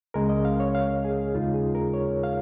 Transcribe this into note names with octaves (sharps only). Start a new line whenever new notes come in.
C#2 C#3 G#3 C#4 A#4
D#5
F5
C#5
F5
G#4
D#2 C#3 G#3 D#4 F4
G#4
A#4
C#5
F5